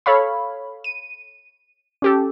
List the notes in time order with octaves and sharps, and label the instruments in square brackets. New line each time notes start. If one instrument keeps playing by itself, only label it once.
[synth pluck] A4 C#5 F5 B5
D#7
C#4 G4 A4